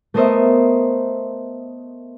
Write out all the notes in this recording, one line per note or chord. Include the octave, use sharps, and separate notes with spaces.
A3 B3 A#4 C5 D#5 E5